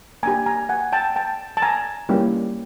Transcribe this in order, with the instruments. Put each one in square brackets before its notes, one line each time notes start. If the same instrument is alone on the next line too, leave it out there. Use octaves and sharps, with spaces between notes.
[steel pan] A#3 D4 G4 G#5 A#5
G#5 A#5
F#5 G#5
G5 A5
G5 A5
A5
G#5 A#5
G3 A#3 C#4 E4 G4